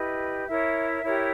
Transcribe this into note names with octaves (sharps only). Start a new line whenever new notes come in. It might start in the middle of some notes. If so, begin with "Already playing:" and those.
Already playing: E4 G4 B4 D#5
E4 A#4 C#5 E5
E4 G4 A#4 C#5